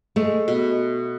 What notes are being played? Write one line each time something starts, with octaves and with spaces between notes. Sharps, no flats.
G#3 A3
B2